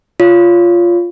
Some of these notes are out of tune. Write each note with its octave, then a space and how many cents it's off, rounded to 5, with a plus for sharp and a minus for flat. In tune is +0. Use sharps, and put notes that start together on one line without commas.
F4 +0 C#5 +25